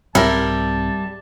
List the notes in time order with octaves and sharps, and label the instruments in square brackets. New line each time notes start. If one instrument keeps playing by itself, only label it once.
[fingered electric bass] C2 G#2 C4 [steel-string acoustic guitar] G3 [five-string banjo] E4 A#4 [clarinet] A5